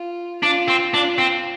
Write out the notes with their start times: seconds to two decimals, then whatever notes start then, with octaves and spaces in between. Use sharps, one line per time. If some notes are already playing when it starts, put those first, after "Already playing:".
Already playing: F4
0.43 D4 F4
0.68 C4
0.93 D4 F4
1.18 C4